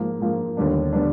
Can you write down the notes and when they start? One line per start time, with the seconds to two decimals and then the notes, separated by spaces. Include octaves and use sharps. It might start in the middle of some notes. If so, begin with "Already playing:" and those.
Already playing: G#2 F3 A#3
0.20 G#2 F3 A#3
0.57 D#2 D3 G3 B3 D4
0.93 D3 G3 B3 D4